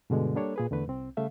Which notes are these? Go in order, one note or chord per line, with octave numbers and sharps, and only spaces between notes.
G2 B2 D3 G#3
G3 A#3 D4 A4 C#5
A#2 G#4 B4
E2 D3 A3 B4
C2 C4
C#3 G3 A3 E5 F5